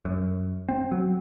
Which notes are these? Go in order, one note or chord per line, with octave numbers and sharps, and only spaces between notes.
F#2
C4
F#3